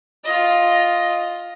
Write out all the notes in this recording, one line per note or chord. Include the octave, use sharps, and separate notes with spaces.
F4 D#5